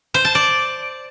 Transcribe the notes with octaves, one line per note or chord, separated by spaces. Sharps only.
C5
A5
D5